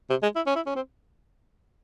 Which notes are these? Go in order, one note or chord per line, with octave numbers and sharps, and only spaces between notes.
C3
G#3
E4
C#4
E4
C#4
C4